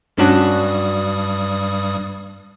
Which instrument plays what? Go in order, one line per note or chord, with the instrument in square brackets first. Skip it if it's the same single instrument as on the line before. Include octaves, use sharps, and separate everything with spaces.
[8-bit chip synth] G2 G3 D#6 [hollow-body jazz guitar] C#4 D4 F#4